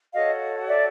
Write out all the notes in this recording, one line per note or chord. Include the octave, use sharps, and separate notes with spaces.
F#4 A4 C#5 D#5 F5
D5 E5